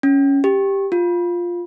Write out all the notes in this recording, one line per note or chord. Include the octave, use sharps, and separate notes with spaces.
C#4
G4
F4